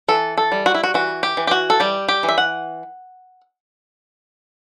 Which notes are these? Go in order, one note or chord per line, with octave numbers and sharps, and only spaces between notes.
E3 A4
A4
G3
F#4
E4
F#4
E3 F#4
G4
E3
G4
F#4
A4
G3 G4
G4
E3
E5
F#5